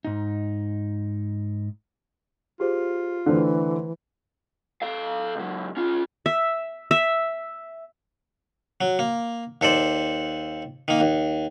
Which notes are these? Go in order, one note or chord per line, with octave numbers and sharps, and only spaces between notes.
G#2 D#4
F4 G4 G#4 C5
D3 E3 A3 D4 C5
A4 F5
C#2 F#3
C#4 F4
E5
E5
F#3
A#3
D#2 A4 C5 D5
D#3 A#3
D#2